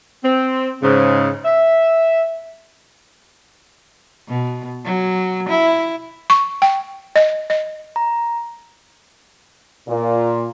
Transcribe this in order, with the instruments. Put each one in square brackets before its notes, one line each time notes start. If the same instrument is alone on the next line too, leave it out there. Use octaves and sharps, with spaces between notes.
[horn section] C4
G#2 C#3
E5
[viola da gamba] B2
F#3
E4
[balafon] C#6
G5
D#5
D#5
[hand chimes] A#5
[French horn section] A#2